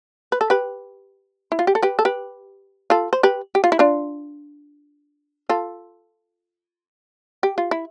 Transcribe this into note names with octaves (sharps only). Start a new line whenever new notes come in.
B4
A4
G4 B4
E4
F4
G4
A4
G4 B4
A4
G4 B4
F4 A4
C5
G4 B4
G4
F4
E4
D4 F4
F4 A4
G4
F4
E4